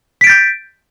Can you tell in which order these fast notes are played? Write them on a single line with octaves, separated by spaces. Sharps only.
B6 D7 A6 G6